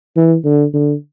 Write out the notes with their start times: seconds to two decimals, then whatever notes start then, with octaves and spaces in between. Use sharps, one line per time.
0.16 E3
0.44 D3
0.73 D3